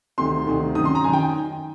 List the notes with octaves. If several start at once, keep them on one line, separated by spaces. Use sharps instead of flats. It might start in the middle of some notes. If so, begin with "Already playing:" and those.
D2 C3 D#3 C6
D2 C3 D#3
F#2 D#3 D#6
C6
A#5
F#2 D#3 G#5
G5